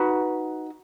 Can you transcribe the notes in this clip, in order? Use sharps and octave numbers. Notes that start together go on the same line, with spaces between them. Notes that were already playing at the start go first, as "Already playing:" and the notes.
Already playing: D#4 F#4 B4